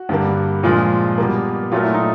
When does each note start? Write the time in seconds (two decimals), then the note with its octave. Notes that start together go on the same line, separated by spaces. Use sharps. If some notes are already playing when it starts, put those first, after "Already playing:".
Already playing: F#4
0.09 G2 D3 G3 A#3
0.63 A#2 F3 G#3 F4
1.18 B2 G3 A#3
1.72 A#2 F#3 A3 F4
1.83 E4
1.94 D#4